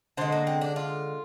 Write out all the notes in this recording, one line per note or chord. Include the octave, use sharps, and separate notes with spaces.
D3 G#3 C4
A#3
C4
D4
F4